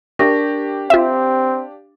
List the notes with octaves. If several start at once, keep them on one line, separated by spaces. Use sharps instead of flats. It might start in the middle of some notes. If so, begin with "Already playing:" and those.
D4 G4 A#4 C#6 A#6
C4 F4 E5 F5